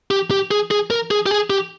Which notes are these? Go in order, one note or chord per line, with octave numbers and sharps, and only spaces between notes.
G4
G4
G#4
G#4
A#4
G#4
G4
G#4
G4